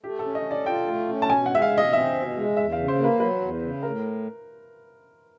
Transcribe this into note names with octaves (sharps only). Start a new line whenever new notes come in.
A3 G4
C#4 A4
D#5
A4
D5
F4 G5
A3
C#4
A5
B2 G#5
F#5
G#3 E5
F5
B2
D#5
C4 E5
B2
G#3
E2 E5
F5
C#3
C5
A#3
B4
F#3 B4
E2
C#3
A2 A#4